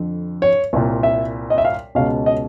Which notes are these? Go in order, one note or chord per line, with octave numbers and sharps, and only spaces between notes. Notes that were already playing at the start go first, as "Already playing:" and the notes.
Already playing: F2 D3
C#5
C2 A#2
E5
D#5
E5
F5
C#2 B2 F5
D#5